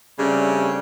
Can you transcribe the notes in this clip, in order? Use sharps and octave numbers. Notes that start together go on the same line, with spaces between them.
C#3 G3 A3 C4 D4